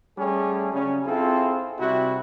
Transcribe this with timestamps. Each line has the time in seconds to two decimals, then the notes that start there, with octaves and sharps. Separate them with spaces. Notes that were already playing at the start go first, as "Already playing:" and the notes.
0.18 G3 A3 C#4 G#4
0.74 C#3 F#3 G3 C#4
1.07 C4 E4 F4 G#4 A4
1.80 C3 G3 E4 F#4